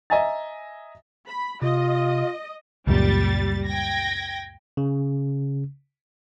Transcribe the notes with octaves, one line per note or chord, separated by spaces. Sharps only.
D#5 E5 G#5 A#5 A6
B5
C3 F4 D#5
C#2 F#2 A#2 G3 A6
G5 G#6 A#6
C#3